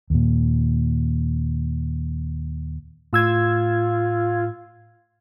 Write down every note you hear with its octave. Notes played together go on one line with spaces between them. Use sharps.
D#2 A#2
A2 F4 E6 G#6